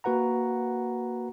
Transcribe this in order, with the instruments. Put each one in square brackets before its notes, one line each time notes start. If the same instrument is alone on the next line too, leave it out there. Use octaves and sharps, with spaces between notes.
[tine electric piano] A#3 F#4 B4 F#5 A#5